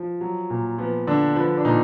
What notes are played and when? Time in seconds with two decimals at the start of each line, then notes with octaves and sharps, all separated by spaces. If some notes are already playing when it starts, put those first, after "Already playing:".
Already playing: F3
0.21 F#3
0.50 A#2
0.78 F3 B3
1.07 D3 D4
1.36 F3 B4
1.57 D4
1.65 A#2 D#4